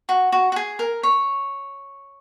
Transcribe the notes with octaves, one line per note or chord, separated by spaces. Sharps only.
F#4
F#4
F#4
G#4
A#4
C#5